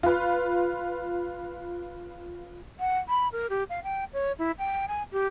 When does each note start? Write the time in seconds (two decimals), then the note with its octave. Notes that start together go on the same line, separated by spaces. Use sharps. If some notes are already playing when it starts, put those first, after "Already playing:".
0.03 F4 B4
2.79 F#5
3.08 B5
3.32 A#4
3.49 G4
3.69 F5
3.83 G5
4.13 C#5
4.38 E4
4.58 G5
4.88 G#5
5.12 G4